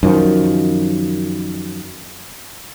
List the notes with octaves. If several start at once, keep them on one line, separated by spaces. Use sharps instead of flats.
F#2 D#3 F3